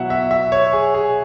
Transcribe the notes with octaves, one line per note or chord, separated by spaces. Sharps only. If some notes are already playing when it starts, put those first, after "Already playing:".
Already playing: B2 F#3 E4 E5 F#5
E5
E5
C#5
G#4
G#4